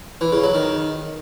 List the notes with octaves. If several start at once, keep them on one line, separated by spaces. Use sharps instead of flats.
E3
C#3
F#3
D#3